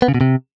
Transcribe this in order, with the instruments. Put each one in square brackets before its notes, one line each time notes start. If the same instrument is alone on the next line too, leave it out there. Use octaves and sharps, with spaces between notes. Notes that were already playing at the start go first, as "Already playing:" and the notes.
[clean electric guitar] B3
C#3
B2
C3